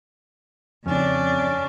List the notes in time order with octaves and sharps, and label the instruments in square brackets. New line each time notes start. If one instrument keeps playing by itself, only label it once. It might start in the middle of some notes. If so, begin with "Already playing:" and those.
[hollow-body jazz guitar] F2 [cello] C#3 D4 [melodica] C#4